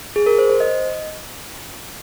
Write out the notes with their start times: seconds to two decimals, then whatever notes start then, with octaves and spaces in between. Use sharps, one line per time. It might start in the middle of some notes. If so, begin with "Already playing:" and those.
0.16 G#4
0.26 A#4
0.38 C5
0.50 C5
0.60 D#5